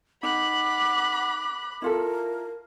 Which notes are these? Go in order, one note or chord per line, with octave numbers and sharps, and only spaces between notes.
D#4 F#5 B5 D6 F#6
E4 F4 A4 A#4